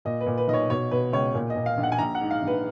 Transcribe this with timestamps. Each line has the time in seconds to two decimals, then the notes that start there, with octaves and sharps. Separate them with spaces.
0.05 A#2 D#5
0.21 B4
0.26 A#2
0.38 B4
0.48 B1 D#5
0.54 C#5
0.70 B2 C#5
0.91 B2 B4
1.12 C#2 C#5
1.34 A#2
1.50 D#5
1.56 A#2
1.66 F5
1.77 A#1
1.83 F#5
1.92 G#5
1.99 A#1 A#5
2.15 F#5
2.21 G#2
2.31 F5
2.42 A#1
2.47 B4